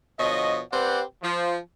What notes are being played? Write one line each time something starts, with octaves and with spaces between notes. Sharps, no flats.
B2 D3 F3 C#5 D#5
C4 G4 B4 C5 D5 F#5
F3